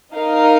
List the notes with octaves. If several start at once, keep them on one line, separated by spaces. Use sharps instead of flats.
D#4 A#4 F5